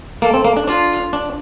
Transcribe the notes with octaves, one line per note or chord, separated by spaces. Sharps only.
A#3 A4
C4
A#3
D4
D4 F4
D4